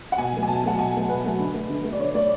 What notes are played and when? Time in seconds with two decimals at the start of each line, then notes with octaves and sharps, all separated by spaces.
0.12 F#5
0.18 B2 G#5
0.33 F#3 A3
0.43 G#5
0.48 B2 A5
0.63 F#3 A3 F#5
0.79 B2 G#5
0.94 F#3 A3
1.09 B2 B4
1.24 F#3 A3
1.39 D3
1.54 A3
1.69 D3
1.84 A3
1.92 D5
1.99 D3 C#5
2.14 A3 D5